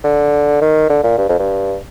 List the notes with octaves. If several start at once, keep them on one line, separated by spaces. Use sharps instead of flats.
D3
D#3
D3
A#2
G2
F2
G2